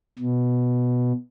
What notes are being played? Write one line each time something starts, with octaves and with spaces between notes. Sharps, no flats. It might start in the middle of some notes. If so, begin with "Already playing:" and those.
B2